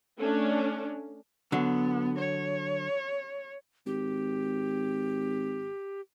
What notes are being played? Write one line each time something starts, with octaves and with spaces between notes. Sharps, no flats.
A3 C#4 D4
D3 F#3 B3
C#5
G#1 G4